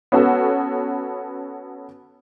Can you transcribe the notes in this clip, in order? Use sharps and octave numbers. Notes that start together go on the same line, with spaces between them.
B3 C#4 F#4 A4